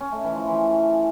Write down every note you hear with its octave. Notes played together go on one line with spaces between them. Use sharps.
C#4
A3
E3
F3
E3